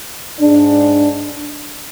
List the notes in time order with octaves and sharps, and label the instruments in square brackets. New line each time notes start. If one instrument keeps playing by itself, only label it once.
[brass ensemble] G#2 G#3 D4